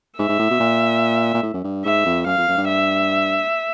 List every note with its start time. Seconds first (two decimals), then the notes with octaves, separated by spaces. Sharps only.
0.19 G#2 E5
0.29 G#2
0.39 A2
0.50 B2
0.60 A#2
1.34 A#2
1.43 A2
1.54 F#2
1.64 G2
1.85 G#2 E5
2.05 F2
2.26 F#2 F5
2.37 F2
2.48 F#2
2.57 G2
2.68 E5